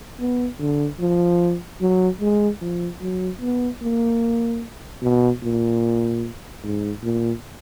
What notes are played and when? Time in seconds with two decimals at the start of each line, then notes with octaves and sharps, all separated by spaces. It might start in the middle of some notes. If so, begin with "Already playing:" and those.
0.20 B3
0.59 D3
1.00 F3
1.81 F#3
2.21 G#3
2.61 F3
3.01 F#3
3.41 B3
3.82 A#3
5.02 B2
5.43 A#2
6.64 G#2
7.03 A#2